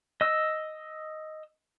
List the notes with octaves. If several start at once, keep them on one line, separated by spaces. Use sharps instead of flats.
D#5 E6